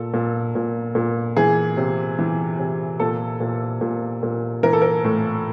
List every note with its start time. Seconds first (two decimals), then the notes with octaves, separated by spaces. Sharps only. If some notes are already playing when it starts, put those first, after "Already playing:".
Already playing: A#2 A4
0.14 A#2
0.55 A#2
0.95 A#2
1.37 E3 G#4
1.77 C3
2.19 E3
2.59 C3
3.00 A#2 A4
3.40 A#2
3.81 A#2
4.23 A#2
4.63 E3 A#4
4.73 A4
4.82 A#4
5.04 A2